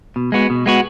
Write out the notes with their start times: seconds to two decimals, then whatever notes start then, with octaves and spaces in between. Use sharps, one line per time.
0.16 B2
0.32 G#3 B3 F#4
0.50 B2
0.66 G#3 B3 F#4